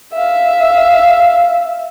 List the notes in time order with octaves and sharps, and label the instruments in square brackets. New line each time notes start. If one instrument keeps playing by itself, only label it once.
[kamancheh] E5 F5